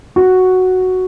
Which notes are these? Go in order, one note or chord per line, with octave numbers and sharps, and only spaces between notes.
F#4